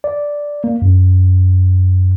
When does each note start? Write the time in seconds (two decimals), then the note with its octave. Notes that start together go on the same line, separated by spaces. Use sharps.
0.04 D5
0.64 A#3
0.82 F#2